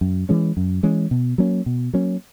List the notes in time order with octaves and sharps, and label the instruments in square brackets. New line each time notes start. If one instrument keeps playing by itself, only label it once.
[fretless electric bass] F#2
E3 G#3 C#4
F#2
E3 G#3 C#4
B2
F#3 A#3 C#4
B2
F#3 A#3 C#4